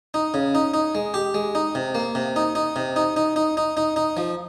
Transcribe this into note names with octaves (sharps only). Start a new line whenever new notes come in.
D#4
C#3
D#4
D#4
G#3
G4
G#3
D#4
C3
A#3
C3
D#4
D#4
C3
D#4
D#4
D#4
D#4
D#4
D#4
F3